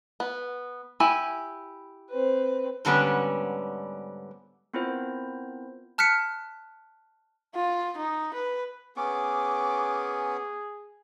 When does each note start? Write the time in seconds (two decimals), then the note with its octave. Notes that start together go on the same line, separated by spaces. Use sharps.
0.20 B3
1.00 E4 G4 G#5
2.10 C4 B4
2.85 G#2 D3 G3 B3 C#4
4.74 B3 C4 E4 F4 A#4 C5
5.98 A5 F6 F#6 B6 C#7
7.55 F4
7.97 D#4
8.34 B4
8.97 B3 C#4 G#4 D6